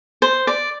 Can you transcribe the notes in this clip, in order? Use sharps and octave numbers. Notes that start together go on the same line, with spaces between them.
C5
D5